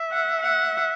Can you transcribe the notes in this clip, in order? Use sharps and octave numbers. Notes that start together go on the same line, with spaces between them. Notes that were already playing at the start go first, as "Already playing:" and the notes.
Already playing: E5
F#5
F#5